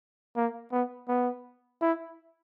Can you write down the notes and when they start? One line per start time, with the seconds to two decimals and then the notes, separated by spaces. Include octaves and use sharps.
0.36 A#3
0.72 B3
1.08 B3
1.81 E4